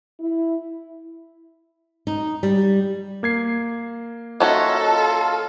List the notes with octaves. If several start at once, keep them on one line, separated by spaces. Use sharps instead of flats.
E4
D#4
G3
A#3 G#6 C7
D#3 C#4 F4 F#4 A4 D#5 E5
F4